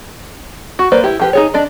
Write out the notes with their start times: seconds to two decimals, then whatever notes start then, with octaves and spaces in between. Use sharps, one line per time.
0.79 F#4
0.92 A#3 B4 C5 D5
1.04 E4 G4
1.20 F3 G4 B4
1.33 D#4 G#4 C#5
1.54 D4 D5 D#5